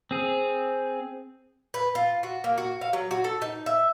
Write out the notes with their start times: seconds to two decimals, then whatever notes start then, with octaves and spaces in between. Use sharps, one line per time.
0.11 C4 G#4
1.74 B4
1.95 F4
2.23 F#4
2.44 A#3
2.58 F#4
2.81 F5
2.93 F#3
3.11 F#4
3.24 A4
3.42 D#4
3.66 E5